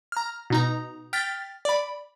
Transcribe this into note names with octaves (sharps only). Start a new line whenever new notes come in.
A#5 F6
B2 D#4 A#5
G5 F6 A6 B6
D5 B5